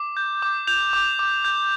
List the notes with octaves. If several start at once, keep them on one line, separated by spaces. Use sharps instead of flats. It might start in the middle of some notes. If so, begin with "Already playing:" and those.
Already playing: D6
G6
D6
G6 F7
D6
D6
G6